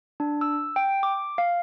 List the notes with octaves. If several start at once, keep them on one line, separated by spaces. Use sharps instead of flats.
D4
E6
G5
D6
F5